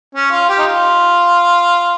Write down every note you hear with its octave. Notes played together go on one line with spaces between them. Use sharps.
C#4
F4
G4
D#4
F4